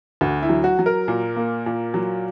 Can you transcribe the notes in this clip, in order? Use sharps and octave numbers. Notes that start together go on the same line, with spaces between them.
D2 F#4
E4
F#3
F#4
F#3
A#4
A#2
A#3
A#2
F#3